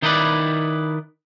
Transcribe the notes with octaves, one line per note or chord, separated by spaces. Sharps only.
D#3 D#4 E4 A#4 B4 D5